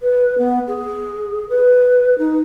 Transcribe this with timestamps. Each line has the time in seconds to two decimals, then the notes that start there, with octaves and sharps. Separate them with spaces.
0.01 B4
0.38 B3
0.68 G#4
1.49 B4
2.18 D#4